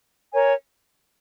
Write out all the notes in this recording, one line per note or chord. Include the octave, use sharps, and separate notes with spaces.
A#4 C#5 G#5